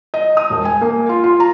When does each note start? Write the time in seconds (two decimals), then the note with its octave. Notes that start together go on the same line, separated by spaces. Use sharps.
0.14 D#5
0.37 D#6
0.50 E1
0.65 G#5
0.81 A#3
1.09 F4
1.24 F4
1.40 A#5